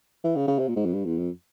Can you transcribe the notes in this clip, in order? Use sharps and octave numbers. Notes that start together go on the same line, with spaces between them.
E3
C#3
C#3
C3
A#2
G#2
F2
G2
E2
F2